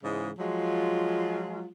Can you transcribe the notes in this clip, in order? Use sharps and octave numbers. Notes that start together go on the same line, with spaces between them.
G#2 C#3 E3 G#3
F3 F#3 G#3 F4